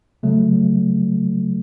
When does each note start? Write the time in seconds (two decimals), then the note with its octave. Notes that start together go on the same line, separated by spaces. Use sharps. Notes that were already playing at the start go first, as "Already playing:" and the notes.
0.23 C#3 F#3 A3